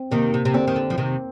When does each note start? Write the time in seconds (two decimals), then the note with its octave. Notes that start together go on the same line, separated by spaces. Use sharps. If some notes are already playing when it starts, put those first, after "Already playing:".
Already playing: C4
0.11 C3 D#3 A#3
0.34 C3
0.45 C3
0.54 D3 C4
0.67 D#3
0.76 D3
0.90 F3
0.98 C3 D#3